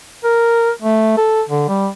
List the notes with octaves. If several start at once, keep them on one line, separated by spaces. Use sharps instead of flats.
A#4
A3
A4
D3
G3